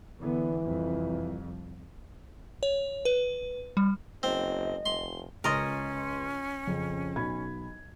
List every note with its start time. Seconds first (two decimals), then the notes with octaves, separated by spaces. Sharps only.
0.20 D3 E3 B3
0.61 C2 F2
2.63 C#5
3.05 B4
3.77 G3
4.23 F#1 C4 D#5
4.86 F1 C6
5.44 C#2 C#4 A#4 D#5 C6 A6
6.67 F2 C#3
7.16 B1 B5 G#6